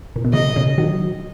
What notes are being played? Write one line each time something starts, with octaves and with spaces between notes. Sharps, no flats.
A#2
B2
A#2 C#3 D#5
A#2 C#3
D#3 F#3